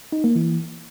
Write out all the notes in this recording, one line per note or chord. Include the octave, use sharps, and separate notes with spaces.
D#4
A#3
E3